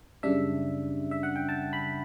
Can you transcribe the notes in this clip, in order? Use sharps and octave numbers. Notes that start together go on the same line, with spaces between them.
F#2 C#3 G3 D4 E5
E5
F#5
G5
A5
B5